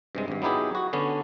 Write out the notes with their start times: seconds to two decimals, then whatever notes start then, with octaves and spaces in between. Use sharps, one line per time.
0.15 G2 C3 G#3
0.28 G#1 G2
0.42 F#3 B3 D#4 E4 G4 G#4
0.75 F#4
0.93 D3 B3 C#4 D4